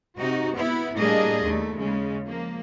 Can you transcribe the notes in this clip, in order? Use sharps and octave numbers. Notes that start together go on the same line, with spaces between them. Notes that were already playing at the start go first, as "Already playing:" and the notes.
C3 D#4 F#4
B3 E4
A2 G3 A#3 D4 G#4 D#5
D#2 A3
C#3 G#3
F3 A#3